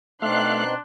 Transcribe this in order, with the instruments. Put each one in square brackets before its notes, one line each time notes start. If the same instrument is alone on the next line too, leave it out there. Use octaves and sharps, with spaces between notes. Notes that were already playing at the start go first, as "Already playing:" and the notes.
[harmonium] B2 C4 D#4 [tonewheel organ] A3 F5 [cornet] D4 [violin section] C6 F#6